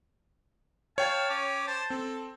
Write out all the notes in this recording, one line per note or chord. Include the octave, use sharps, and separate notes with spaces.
C#5 F5 G5 A5
C#4 D6
C5 A5
C4 A4